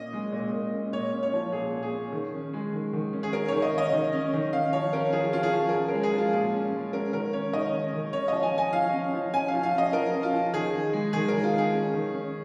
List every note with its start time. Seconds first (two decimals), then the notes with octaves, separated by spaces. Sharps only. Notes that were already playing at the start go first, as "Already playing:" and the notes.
Already playing: A#2 C#4 D#5
0.13 G#3
0.32 A#2
0.53 A#2
0.73 C#4
0.92 A#2 C#5
1.13 C#4
1.23 C#5
1.33 F3
1.52 A#2 G#4
1.73 A#2
1.83 G#4
1.93 C#4
2.13 D#3
2.33 C#4
2.53 G#3
2.73 D#3
2.93 D#3
3.13 C#4
3.23 G#4
3.33 C#4 A#4
3.48 D#3 C#5
3.62 D#5
3.73 C#4
3.78 D#5
3.93 D#3
4.13 C#4
4.34 D#3
4.53 C#4 F5
4.73 F3 C#5
4.93 C#4 A#4
5.13 F3 G#4
5.33 C#4 F4
5.43 G#4
5.53 F3
5.69 A#4
5.73 C#4 G#4
5.88 G#3 A#4
6.03 G#4
6.13 F3 F4
6.33 A#2 G#4
6.53 C#4
6.73 G#3
6.93 C#4 A#4
7.13 D#3 A#4
7.33 C#4 C#5
7.53 D#3 D#5
7.73 C#4
7.93 D#3
8.13 C#4 C#5
8.28 F3 D#5
8.43 G#5
8.53 C#4 G#5
8.73 F3 F5
8.93 C#4
9.14 F3
9.33 C#4 G#5
9.48 F5
9.54 F3
9.63 F5
9.74 C#4 D#5
9.93 F3 A#4
10.14 C#4
10.23 F4
10.33 F3
10.53 D#3 G#4
10.73 D#4
10.93 G#3
11.13 D#3 G#4
11.28 D#3 A#4
11.44 F4
11.53 D#4 G#4
11.73 C#4
11.94 D#3
12.14 C#4